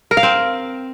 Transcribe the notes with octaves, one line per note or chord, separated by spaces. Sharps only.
A#4
F5
C4